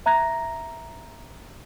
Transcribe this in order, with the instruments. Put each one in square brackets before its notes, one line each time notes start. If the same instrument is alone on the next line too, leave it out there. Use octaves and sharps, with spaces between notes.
[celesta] E5 A#5 F#6 G#6 A#6